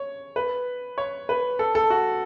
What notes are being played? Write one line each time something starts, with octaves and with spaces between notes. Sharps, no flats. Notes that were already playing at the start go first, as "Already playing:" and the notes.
Already playing: C#5
B4
C#5
B4
A4
A4
F#4